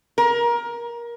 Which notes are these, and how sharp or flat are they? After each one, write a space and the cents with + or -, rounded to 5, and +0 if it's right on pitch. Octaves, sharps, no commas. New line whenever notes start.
A#4 +20